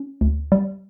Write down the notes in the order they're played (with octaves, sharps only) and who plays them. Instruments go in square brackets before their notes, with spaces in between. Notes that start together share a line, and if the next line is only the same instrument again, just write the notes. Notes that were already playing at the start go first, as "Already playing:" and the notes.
Already playing: [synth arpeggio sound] C#4
D2
G3